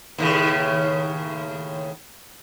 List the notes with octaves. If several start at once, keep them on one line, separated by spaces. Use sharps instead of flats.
D#2 A2 C#3